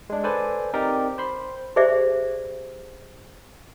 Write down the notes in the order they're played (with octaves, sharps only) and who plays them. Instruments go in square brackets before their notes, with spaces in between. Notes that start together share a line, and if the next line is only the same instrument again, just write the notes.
[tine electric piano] G#3 D4
A4 B4 C5 D5 G#5
C4 D#4 G4 A#4 D5
C5 B5 C6
[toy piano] G4 G#4 C5 D5 E5